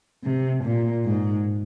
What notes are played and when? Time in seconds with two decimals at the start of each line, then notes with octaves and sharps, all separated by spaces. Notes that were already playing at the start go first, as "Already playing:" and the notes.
0.24 C3
0.64 A#2
1.05 G#2